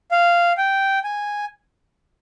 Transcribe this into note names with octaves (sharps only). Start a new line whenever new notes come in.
F5
G5
G#5